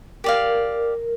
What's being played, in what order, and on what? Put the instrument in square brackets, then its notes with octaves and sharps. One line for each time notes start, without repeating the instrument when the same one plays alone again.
[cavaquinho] G4 D5 F5 [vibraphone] A#4